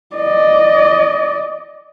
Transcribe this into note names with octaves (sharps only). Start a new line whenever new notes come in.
D5 D#5